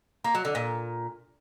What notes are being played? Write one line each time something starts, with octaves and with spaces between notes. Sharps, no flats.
A#3
F#3
D3
A#2